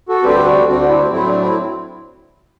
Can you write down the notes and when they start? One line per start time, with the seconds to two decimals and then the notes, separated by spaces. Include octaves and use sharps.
0.09 F#4 A4
0.23 D2 D3 G3 C4 G4 B4
0.45 D4 F#4
0.67 D2 D3 G3 C4 D4 F#4
0.82 F#4
0.89 C4 E4
1.11 A2 F#3 A3 C4 E4
1.26 D4
1.41 C4 E4